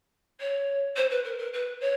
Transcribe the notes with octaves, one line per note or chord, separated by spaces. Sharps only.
C#5
C5
B4
A#4
A#4
B4
C#5